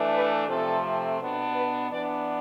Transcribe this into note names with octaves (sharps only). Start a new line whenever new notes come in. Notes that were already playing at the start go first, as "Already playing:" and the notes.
Already playing: E3 A3 D4
B4
C3 F3 A3 C4 A4
B2 B3 D4
B4
E3 B3 D4 D5